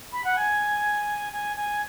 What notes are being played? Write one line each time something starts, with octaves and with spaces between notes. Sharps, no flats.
B5
F#5
G#5
G#5
G#5